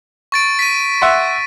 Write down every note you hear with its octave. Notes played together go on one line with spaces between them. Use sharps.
C#6 A6 D7
B6 D#7
E5 F#5 C6